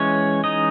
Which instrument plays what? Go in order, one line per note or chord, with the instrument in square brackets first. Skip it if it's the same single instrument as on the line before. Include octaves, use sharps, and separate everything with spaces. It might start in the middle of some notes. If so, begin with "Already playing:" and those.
Already playing: [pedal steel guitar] E3 G#3 C#4 C#5
D#4 D#5